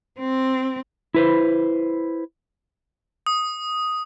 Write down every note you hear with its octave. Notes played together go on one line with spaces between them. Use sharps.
C4
E4 B4 C5
D#6